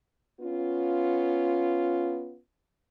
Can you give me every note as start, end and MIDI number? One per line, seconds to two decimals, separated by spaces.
0.40 2.37 59
0.40 2.37 61
0.40 2.37 65